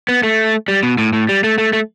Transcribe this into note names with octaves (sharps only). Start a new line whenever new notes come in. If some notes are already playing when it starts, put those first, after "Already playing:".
B3
A3
G3
B2
A2
A2
G3
A3
A3
A3